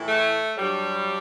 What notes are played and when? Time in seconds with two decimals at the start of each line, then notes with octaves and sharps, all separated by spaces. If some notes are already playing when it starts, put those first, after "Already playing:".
Already playing: A2 E3
0.08 A3
0.57 G2 F#3 G3